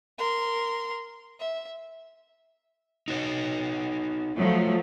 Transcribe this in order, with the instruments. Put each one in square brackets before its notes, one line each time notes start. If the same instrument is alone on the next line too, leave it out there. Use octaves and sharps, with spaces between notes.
[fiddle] A#4 C6
E5
[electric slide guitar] D#4 F#4 C#5
[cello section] F3 F#3 A3